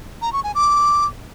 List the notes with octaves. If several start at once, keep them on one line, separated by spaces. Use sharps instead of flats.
A#5
C#6
G#5
D6